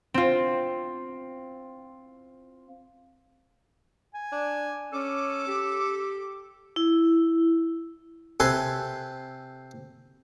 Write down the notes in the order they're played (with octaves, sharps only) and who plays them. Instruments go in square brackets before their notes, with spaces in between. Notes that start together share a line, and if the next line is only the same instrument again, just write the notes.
[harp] C4 F4
[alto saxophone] G#5
[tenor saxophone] D4
[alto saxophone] C#4 [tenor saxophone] A4 [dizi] D6
[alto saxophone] G4
[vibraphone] E4
[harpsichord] C3 A4 B4 G#5 C6